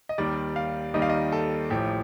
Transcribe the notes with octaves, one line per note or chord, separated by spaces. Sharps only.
D#5
D#2 D#3 G3 D5
F5
D#2 D#3 G3 D#5
F5
D#5
A4
A1 A2 F3 G4